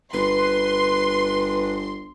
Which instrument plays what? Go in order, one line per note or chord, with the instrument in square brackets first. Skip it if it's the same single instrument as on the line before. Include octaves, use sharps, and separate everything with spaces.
[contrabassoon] G1 [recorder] B4 [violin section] C6